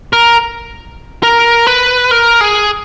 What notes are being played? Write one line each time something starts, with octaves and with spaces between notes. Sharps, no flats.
A#4
A#4
B4
A#4
G#4